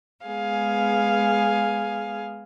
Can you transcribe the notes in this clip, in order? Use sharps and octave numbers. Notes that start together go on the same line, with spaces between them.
G#3 B3 G#4 F5 G#5